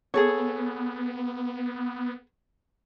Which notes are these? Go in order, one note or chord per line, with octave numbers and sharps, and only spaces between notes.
B3 G#4 A4 C#5